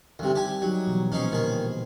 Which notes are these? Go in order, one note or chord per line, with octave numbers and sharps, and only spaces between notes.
D2 C3 D#3 G3
G4 G#5
F#3 D#4 G4
B2 E3 F3
A#2 B3 C#4 D#4 G#4 C5
D3 D#3 G#4